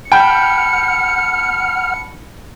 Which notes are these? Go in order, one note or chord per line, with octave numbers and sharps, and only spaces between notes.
F#5 G5 A5 B5 F6 C#7